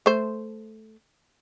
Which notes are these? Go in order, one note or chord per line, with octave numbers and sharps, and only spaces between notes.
A3 C5